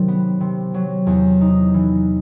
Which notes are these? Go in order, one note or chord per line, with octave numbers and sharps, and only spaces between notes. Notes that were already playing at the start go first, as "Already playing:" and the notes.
Already playing: C3 D#3 F#3
B3
C3
F#3
E2
D#4
E3